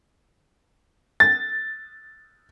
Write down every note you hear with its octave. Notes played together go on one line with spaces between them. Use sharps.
A6